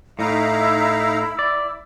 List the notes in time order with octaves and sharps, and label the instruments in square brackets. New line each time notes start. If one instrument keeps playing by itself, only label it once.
[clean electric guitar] A2 [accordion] D#4 F5 A#5 [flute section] E4 B5 E6
[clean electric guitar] D5